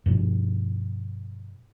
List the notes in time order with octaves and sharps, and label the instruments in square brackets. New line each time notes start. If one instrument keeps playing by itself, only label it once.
[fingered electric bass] G2 B2 F3